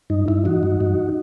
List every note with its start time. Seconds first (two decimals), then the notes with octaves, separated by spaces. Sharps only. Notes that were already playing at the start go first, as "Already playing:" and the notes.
0.10 G2 D#4
0.28 G2 E4
0.45 E3 D#4 F#4
0.63 G2
0.81 G2